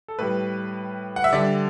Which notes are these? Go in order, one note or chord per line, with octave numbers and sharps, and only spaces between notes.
A4
A2 G3 B4
F#5
E5
D3 G3 D5